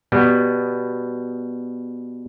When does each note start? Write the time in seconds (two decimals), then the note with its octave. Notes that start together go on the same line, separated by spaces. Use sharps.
0.12 B2 G3 B3